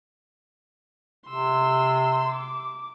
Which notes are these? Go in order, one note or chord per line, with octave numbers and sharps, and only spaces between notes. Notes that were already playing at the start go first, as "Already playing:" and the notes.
C3 C6 E6
D6